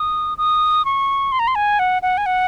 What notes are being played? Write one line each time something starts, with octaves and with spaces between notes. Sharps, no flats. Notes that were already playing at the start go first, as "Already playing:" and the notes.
Already playing: D#6
D#6
C#6
C6
A#5
C6
G#5
F#5
F#5
G#5
F#5